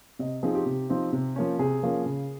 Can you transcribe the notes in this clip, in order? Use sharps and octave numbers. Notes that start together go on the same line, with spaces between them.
C3 D#5
F3 C4 D#4 G#4
G4
C3
F3 C4 D#4
C3
F3 A#3 C#4
C3 G#4
F3 A#3 C#4
C#3